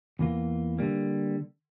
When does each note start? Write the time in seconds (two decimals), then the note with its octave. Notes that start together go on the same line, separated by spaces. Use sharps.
0.19 E2 E3 A#3 F4
0.79 D3 G3 A#3